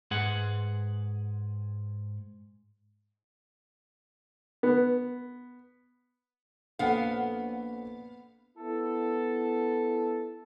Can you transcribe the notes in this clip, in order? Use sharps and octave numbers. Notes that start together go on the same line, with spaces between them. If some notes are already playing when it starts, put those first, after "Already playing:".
G#2 G#4 B4 F#5
B3
A#1 B3 A4 F5 F#5
B3 E4 A4